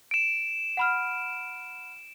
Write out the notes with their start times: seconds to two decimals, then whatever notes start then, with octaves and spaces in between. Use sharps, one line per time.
0.11 D7 E7
0.77 F#5 B5 F6